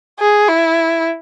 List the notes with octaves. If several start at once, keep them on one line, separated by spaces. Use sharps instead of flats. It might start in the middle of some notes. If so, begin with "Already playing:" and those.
G#4
E4